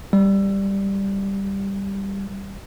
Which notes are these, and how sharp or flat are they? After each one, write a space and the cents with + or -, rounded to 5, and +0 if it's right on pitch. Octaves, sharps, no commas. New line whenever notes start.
G3 +5